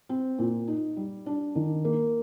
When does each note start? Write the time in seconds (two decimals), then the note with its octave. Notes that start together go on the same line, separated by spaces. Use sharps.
0.09 C4
0.39 A#2
0.68 D#4
0.97 G3
1.26 D4
1.55 D#3
1.85 A#3